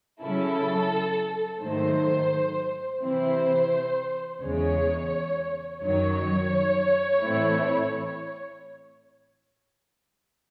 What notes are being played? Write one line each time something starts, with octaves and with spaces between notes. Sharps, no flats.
C#3 F#3 C#4 E4 A4
G#2 D#3 F#3 A3 C5
C3 E3 C4 E4 C5
E2 C#3 G#3 C#5
F#2 D#3 F#3 C#5
A2 E3 A3 C4 E4